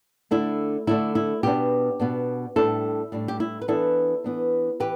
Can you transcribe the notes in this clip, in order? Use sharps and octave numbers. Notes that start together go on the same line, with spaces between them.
D3 A3 D4 E4
D3 A3 D4 E4
E4
B2 B3 D4 G4
B2 B3 D4
A2 G3 D4 E4 A4
A2 G3 D4
G4
E4
B4
E3 B3 D4 E4 A4
E3 B3 D4
E3 G4 B4